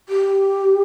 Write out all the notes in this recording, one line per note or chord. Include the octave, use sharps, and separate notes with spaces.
G4